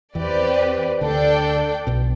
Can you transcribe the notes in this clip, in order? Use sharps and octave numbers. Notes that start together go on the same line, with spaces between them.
E2 E3 C4 G4 B4 D5
D2 D3 D4 A4 D5 G5
B1 B2